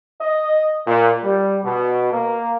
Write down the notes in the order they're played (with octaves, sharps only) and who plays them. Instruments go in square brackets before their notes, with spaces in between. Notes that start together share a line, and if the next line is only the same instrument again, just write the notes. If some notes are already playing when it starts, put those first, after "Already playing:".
[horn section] D#5
A#2
G3
B2
A#3